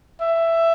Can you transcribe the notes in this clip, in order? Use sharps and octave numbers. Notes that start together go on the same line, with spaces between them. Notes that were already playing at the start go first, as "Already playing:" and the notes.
E5